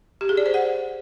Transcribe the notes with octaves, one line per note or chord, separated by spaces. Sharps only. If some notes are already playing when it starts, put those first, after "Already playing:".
G4
G#4
D5
C5
F#5